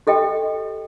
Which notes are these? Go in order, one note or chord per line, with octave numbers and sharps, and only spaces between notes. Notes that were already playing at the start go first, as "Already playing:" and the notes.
G4 A4 D#5 G5